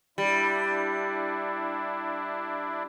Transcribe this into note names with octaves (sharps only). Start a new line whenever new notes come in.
G3 D4 E4